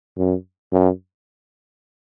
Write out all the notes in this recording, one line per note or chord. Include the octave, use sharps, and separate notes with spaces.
F#2
F#2